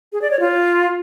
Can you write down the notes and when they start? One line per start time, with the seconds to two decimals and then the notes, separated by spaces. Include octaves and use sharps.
0.13 G#4
0.22 D5
0.31 C#5
0.40 F4